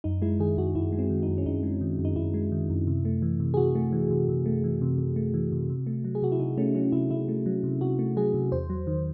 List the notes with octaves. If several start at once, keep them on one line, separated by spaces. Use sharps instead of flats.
F#2 D#4
G#3 E4
D#3 G#4
F#2 F#4
F#2 E4
G#3
C4
D#3
D#4
F#2
C#4
F#2 D#4
G#3
D#3
F#2
D#4
F#2 E4
G#3
D#3
F#2
C3
A3
E3
C3
G#4
C3 F#4
A3
E3
C3
C3
A3
E3
C3
C3
A3
E3
C3
C3
A3
F#3
G#4
C3 F#4
E4
C3 D#4
A3 C#4
F#3 C#4
C3 E4
C3 E4
A3
F#3
C3
C3 F#4
A3
F#3 G#4
C3
E2 C5
F#3
D#3